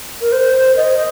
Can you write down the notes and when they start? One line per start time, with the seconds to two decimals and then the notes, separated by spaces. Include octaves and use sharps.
0.21 A#4
0.32 C5
0.76 D#5